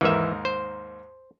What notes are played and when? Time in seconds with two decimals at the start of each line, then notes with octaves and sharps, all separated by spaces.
0.01 D#2 G#2 E3 A#4 E5
0.45 C5